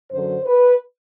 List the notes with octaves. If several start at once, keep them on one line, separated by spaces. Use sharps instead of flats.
F#2 D3 F#3 C5
B4